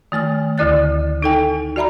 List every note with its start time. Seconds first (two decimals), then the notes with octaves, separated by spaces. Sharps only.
0.12 D#3 A3 G#5 F6
0.58 D2 D3 E4 D5 F#6 A6
1.22 D#4 A4 G5 G#5
1.76 F#4 D5 E5 A#5 B5